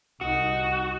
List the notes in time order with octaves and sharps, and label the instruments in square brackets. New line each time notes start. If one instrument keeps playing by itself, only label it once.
[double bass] C2 D#4 [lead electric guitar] F#4